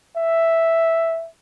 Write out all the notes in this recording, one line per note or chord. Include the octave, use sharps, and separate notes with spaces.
E5